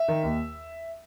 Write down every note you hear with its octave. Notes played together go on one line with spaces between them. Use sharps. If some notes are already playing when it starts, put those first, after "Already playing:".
Already playing: E5
D#3
D#2